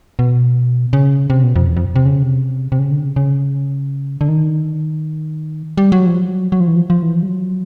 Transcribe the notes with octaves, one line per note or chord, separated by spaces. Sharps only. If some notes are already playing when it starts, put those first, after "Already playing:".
B2
C#3
C3
B2
F2
E2
F2
C3
C#3
C3
C3
C#3
D3
C#3
C#3
D3
D#3
G3
F#3
F3
F#3
F#3
F3
E3
F3
F3
E3
F3
G3
F#3